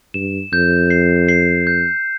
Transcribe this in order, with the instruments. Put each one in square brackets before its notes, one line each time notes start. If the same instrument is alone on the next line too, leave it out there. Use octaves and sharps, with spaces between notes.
[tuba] G2 [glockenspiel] E7
[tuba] F2 [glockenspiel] G6
[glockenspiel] C7
C7
G6